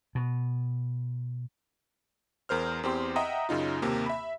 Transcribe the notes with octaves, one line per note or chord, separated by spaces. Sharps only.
B2
E2 A#4 C5 F6
E2 C4 G4 C6
D#5 E5 F#5 G5 A#5 D#6
F#2 C#3 D#4 F4
D#2 C3 A#3
E5 B5